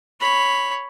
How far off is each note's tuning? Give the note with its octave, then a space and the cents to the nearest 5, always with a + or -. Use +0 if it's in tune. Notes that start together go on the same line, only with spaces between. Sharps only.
C#5 +0 B5 +0